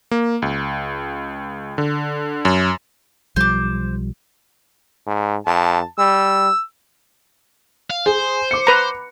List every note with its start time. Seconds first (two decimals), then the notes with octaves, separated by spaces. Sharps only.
0.11 A#3
0.42 C#2
1.78 D3
2.45 F#2
3.36 B1 F3 G3 C5 D6
5.07 G#2
5.46 F2 A5
5.99 G3 E6
7.90 F5
8.06 G#4 C5
8.51 D6 C#7
8.67 B4 A#5